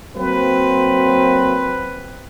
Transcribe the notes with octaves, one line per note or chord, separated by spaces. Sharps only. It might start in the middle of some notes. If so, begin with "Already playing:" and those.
F#3 A#3 C4 B4